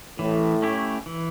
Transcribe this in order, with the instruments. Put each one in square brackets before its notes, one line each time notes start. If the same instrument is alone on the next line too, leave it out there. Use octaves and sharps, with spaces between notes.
[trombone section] A2 [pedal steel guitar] E3
[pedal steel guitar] A3 C#4 E4 G4
E3